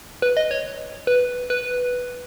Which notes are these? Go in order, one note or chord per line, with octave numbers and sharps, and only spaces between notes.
B4
D#5
C#5
B4
B4